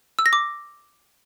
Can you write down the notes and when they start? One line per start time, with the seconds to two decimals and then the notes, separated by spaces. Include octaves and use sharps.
0.19 E6
0.26 A#6
0.33 D6